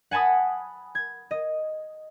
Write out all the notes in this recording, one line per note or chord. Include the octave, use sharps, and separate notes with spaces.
F#5 G#5 A5 B5 D#6
G#6
D#5